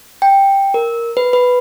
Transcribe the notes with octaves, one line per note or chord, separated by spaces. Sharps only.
G5
A#4
B4
B4